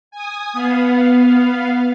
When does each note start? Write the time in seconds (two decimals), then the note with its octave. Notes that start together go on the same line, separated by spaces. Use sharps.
0.11 G#5 D#6
0.53 B3 F5